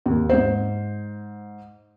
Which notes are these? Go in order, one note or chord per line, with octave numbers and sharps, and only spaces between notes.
D#2
G#2 C5